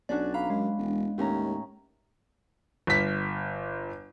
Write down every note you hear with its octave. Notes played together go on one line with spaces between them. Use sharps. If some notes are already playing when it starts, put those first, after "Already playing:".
B1 C#4 D4 F#4 D5
F5 A#5 B5
F#2 G#3
E1
D#2 A2 C#4 A#5
G1 B6